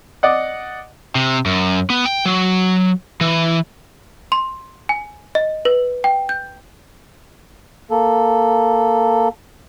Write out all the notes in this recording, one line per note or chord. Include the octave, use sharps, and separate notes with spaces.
D5 D#5 F#5
C3
F#2
B3
G5
F#3
E3
C6
G#5
D#5
B4
G5
G6
A#3 A4